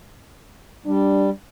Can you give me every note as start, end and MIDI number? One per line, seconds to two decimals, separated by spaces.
0.86 1.30 55
0.86 1.29 62